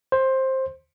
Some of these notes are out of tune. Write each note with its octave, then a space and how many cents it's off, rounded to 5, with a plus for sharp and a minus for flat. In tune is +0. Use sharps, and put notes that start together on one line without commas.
C5 +15